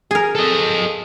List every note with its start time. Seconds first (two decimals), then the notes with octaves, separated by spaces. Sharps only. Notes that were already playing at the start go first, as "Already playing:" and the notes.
0.11 G#4 A#4
0.35 A4 D#5